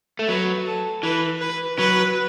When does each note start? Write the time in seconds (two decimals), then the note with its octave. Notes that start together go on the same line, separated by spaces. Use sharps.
0.19 A3
0.28 F#3 B4
0.66 A4
1.03 E3 B4
1.41 B4
1.78 F#3 B4